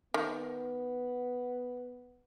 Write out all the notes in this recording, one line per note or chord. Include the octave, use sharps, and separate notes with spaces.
D#3 B3